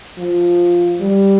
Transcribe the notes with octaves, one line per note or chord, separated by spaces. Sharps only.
F3
G3